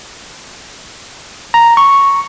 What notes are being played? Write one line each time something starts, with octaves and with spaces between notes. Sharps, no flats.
A#5
C#6